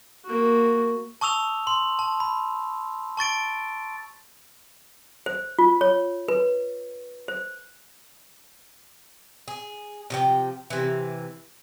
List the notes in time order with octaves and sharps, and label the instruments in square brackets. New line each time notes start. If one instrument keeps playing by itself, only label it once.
[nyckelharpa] A#3 F#4
[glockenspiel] A5 C#6 D#6 E6 F7
C6
A5
B5
A5 C#6 A6 D7
[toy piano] C5
F4
C#5
B4
C5
[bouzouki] G#4
C3 F3 G5
C3 E3